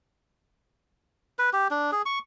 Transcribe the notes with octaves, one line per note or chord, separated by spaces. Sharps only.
B4
G4
D4
G#4
C#6